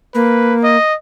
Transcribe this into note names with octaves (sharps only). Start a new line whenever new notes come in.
A#3 B4
D#5